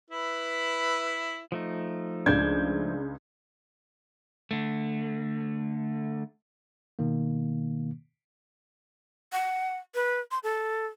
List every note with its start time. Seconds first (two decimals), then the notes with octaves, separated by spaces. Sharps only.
0.10 E4 B4
1.52 F3 A3 D#4
2.26 C#2 D4 G6 G#6
4.51 D3 A3
6.99 B2 D#3 A#3
9.33 F#5
9.95 B4
10.31 C6
10.43 A4